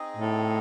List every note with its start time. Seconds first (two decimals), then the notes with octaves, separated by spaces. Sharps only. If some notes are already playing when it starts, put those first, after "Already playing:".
Already playing: C4 D#4 G#4 D#5
0.17 A2